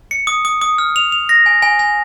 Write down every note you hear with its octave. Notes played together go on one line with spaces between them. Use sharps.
C#7
D#6
D#6
D#6
F6
F7
F7
A#6
G#5
G#5
G#5